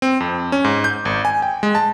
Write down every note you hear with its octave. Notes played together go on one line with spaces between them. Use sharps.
C4
F2
C#4
G#2
G6
G#1
G#5
G5
G#3
A5